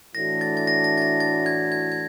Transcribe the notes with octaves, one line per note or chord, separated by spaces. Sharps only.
A2 E3 A3 D4 F#4 A#6
A6
A6
A#6
A#6
A6
A#6
A6
G#6
G#6
G#6